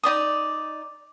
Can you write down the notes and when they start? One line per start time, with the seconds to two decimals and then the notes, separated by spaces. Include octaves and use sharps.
0.04 D#4 E4 D5 D#6